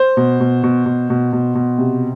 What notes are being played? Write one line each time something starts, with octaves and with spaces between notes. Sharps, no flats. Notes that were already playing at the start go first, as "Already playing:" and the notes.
Already playing: C5
B2
B2
B2
B2
B2
B2
B2
C3